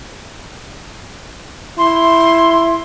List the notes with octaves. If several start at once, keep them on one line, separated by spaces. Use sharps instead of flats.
E4 C6